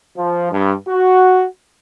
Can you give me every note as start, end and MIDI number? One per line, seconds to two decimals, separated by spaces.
0.18 0.49 53
0.51 0.74 43
0.86 1.45 66